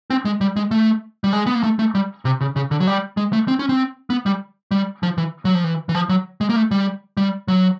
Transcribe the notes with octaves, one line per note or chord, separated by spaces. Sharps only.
C4
G#3
G3
G#3
A3
G3
G#3
B3
A#3
A3
A3
G3
C3
C#3
C#3
D3
F#3
G3
G#3
A3
C4
C#4
C4
B3
G3
G3
F3
E3
F#3
F3
E3
E3
F3
F#3
G#3
A#3
A3
G3
G3
F#3